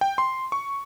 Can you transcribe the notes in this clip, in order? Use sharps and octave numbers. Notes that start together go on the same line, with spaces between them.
G5
C6
C#6